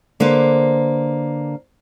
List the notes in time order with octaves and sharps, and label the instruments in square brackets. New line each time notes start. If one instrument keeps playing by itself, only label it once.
[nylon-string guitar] D3 A#3 D4 B4 C5